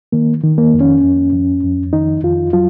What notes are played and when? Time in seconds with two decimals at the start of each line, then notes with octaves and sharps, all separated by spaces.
0.12 D#3 A#3
0.44 D#3
0.58 A#3
0.74 F2
0.81 C#4
1.04 F2
1.33 F2
1.63 F2
1.93 D#3 D#4
2.24 F2 F4
2.53 F#3 F4